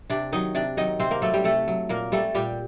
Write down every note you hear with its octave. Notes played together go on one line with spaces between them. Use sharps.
C3 D4 D5
D#3 F#3 D#4 D#5
C3 D4 D5
D#3 F#3 D#4 D#5
C3 C4 C5
A#3 A#4
F#3 A3 A4
G3 G4
C3 A3 A4
F#3
A#2 A#3 A#4
G3 A3 A4
A#2 G3 G4